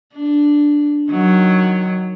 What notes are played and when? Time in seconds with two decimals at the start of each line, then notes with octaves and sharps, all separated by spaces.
0.15 D4
1.10 D#3 F#3